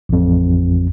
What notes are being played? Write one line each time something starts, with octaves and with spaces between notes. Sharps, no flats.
A1 F2